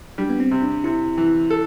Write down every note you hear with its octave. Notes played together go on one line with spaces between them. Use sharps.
G3 D4
B3
C4
C3
D4
C3 E4
E3
A4